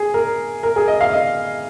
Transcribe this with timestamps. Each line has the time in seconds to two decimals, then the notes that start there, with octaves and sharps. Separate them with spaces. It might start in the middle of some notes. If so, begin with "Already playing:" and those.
Already playing: G#4
0.14 A#4
0.63 A#4
0.76 G#4
0.88 D#5
1.01 F5
1.13 D#5